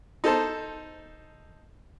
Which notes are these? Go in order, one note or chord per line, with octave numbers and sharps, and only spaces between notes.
D#4 A4 C5 A5